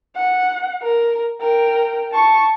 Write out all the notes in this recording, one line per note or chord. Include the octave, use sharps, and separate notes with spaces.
F#5
A#4
A#4 G5
A5 C#6